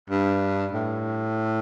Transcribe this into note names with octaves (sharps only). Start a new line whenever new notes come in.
G2
A2